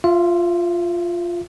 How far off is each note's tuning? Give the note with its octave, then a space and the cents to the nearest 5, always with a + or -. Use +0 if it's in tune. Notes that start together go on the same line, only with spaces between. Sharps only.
F4 +0 E5 +35